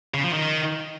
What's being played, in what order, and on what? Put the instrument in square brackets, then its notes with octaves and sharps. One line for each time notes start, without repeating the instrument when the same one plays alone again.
[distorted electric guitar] C#3
F3
D#3